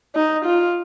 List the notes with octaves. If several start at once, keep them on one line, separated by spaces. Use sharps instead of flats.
D#4
F4